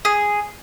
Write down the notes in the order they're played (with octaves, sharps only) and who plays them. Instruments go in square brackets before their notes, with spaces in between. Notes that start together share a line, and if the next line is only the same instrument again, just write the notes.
[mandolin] G#4